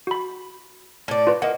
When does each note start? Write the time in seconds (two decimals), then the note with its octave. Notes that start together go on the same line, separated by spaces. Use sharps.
0.07 F#4 B5
1.08 A2 D5
1.27 F4 B4
1.42 A#3 D#5 F#5